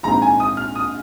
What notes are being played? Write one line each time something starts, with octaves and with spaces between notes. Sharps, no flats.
A#1 G#2 G#3 C4 A#5
G#5
D#6
F6
D#6